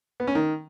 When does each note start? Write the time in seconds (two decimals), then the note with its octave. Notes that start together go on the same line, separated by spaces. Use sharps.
0.20 B3
0.27 C#4
0.35 D#3